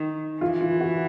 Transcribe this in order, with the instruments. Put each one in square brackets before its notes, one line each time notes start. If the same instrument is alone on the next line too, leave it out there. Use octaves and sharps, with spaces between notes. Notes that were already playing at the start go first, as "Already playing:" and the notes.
Already playing: [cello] D#3
[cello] E3 [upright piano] F4
[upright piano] F4
F#4